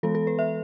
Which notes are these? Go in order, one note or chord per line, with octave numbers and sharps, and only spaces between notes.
E3 G#3 B3 A4
A4
B4
E5